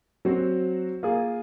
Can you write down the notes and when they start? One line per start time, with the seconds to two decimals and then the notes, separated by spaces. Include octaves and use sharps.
0.25 F#3 C4 F#4
1.03 A#3 F4 G#4